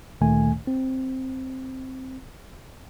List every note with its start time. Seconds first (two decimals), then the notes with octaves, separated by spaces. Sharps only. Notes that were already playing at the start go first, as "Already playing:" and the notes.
0.21 D2 A#2 D#3 A3 G#5
0.67 C4